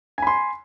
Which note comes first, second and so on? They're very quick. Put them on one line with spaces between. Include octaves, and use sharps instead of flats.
G#5 B5 C6